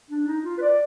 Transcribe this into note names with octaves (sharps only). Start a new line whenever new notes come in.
D4
D#4
F4
B4
D5